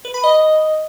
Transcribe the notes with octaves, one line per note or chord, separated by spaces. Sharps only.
B4
B5
D#5